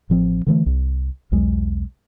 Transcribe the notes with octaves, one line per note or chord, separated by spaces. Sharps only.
A1 F3 C4
D3 E3 A3
C2
B1 E2 F#3 G#3